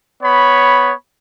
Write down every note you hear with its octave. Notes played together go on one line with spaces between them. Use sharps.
B3 C#5 B5